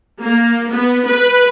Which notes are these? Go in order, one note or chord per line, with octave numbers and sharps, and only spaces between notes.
A#3
B3
B4